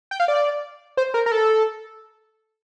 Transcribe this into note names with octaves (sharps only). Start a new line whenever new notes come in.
G5
F5
D5
C5
A#4
A#4
A4